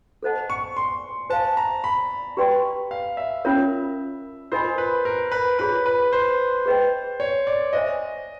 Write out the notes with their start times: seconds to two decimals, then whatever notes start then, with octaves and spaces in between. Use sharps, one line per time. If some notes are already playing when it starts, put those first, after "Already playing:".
0.23 A4 C5 D#5 F#5 A5
0.50 C#6
0.77 C6
1.30 C5 F5 G#5 A5
1.57 A#5
1.84 B5
2.37 G4 B4 D5 G5 C6
2.91 F5
3.17 E5
3.45 C#4 F4 A#4 C#5
4.52 F4 A#4 C5 D#5 G#5 B5
4.78 B4
5.05 A#4
5.32 B4
5.59 F4 G#4 B4 C#5
5.86 B4
6.13 C5
6.66 G#4 B4 D#5 G5
7.20 C#5
7.47 D5
7.73 C5 D#5 E5 G#5